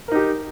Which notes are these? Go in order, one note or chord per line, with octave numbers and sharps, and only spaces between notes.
D#4 G4 A#4